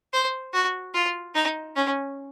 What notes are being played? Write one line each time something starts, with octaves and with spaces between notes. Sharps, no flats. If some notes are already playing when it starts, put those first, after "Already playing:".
C5
F#4
F4
D#4
C#4